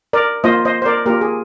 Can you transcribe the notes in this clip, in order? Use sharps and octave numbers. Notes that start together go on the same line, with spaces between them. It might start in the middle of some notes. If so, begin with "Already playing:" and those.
A#4 D5
A#3 F4 C5 D#5
C5 D#5
C5
A#4 D5
A#3 F4 G4 A#4
G#4